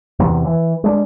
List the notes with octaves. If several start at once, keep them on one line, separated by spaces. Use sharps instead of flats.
E2 C3 E3
E3
G#3 D4